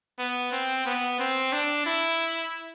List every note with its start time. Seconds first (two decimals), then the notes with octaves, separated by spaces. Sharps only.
0.19 B3
0.52 C4
0.86 B3
1.19 C4
1.53 D4
1.86 E4